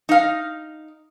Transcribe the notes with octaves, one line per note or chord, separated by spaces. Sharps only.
D#4 F5